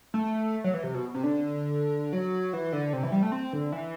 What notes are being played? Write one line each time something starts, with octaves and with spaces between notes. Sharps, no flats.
A3
F#3
E3
C3
B2
C3
D3
F#3
E3
D3
C3
E3
G3
A3
C4
D3
E3